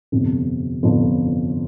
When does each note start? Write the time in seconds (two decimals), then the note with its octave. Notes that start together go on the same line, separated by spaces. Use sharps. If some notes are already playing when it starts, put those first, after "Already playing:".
0.12 G1 F2 C3 F3
0.83 G1 F2 C3 F3